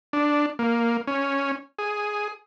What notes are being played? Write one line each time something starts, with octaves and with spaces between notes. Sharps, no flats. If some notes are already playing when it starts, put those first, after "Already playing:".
D4
A#3
C#4
G#4